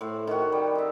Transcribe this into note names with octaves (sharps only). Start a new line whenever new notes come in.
A2 C5 F#5
D#3 F#4
G3
D#4 E5